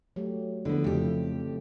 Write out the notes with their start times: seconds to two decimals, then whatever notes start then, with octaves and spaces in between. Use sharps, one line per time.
0.16 F#3 A3 G4
0.65 D3 F3 B3 E4
0.84 F2 C#3 A3 G4
1.40 F3